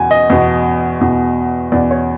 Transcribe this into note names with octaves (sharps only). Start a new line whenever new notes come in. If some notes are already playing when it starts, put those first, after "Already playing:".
Already playing: E2 B2 G#5
D#5
E2 B2
E2 B2
E2 B2 D5
C#5